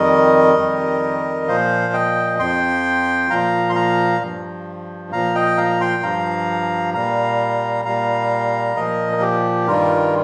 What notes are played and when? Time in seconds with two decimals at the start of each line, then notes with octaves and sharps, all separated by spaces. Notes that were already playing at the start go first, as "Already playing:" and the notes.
Already playing: F2 D#3 G3 A#4 D#5
0.57 F2 D#3 G3
1.48 A#2 F3 C5 F5
1.93 D#5 G5
2.39 F2 F3 G5 C6
3.30 A#2 F3 F5 A#5
3.69 C6
3.75 F5 A#5
4.21 G2 F3
5.12 A#2 F3 F5 A#5
5.35 D#5 G5
5.58 F5 A#5
5.80 G5 C6
6.03 G2 F3 F5 A#5
6.94 A#2 G3 F5 A#5
7.85 A#2 G3 F5 A#5
8.76 A#2 F3 A#4 D#5
9.13 A#4
9.21 G4
9.67 G2 D#3 G3 F4 A#4